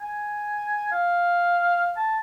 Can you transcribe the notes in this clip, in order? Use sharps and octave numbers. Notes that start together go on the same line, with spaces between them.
G#5
F5
A5